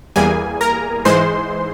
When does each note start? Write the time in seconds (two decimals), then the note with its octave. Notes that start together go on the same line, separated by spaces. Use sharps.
0.16 E2 E3 G3 A#3 G#4 G#5
0.61 A#4 A#5
1.05 G#2 E3 G#3 C5 C6